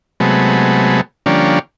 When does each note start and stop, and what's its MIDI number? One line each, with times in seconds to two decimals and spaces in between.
0.20 1.01 48
0.20 1.01 54
0.20 1.01 56
0.20 1.01 57
0.20 1.01 59
1.26 1.59 50
1.26 1.59 53
1.26 1.59 55
1.26 1.59 58
1.26 1.59 61
1.26 1.59 62